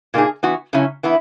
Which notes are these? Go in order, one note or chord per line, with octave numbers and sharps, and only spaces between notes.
A#2 A#3 D#4 G#4
E3 B3 F#4
C#3 F#3 C#4 E4
E3 B3 E4